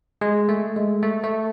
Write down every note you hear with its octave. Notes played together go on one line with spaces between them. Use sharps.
G#3
A3
G#3
A3
A3